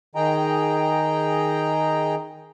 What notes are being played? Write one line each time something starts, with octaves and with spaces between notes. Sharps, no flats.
D#3 G#4 D#5 G5 A#5